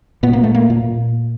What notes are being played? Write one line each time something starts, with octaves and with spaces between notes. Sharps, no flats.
A#2 B3
A#3
A3
A#3
A#2